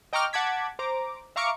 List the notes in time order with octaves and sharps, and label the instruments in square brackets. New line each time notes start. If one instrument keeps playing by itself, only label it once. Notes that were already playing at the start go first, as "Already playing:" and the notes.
[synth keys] D#5 G5 A#5 C#6 D6 F6
F#5 A5 D6 G#6 B6
C5 A#5 D6
E5 F5 A#5 C#6 D6 F6